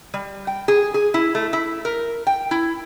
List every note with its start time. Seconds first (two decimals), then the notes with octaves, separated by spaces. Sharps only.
0.14 G3
0.47 G5
0.68 G#4
0.94 G#4
1.14 E4
1.35 A3
1.53 E4
1.85 A#4
2.27 G5
2.51 E4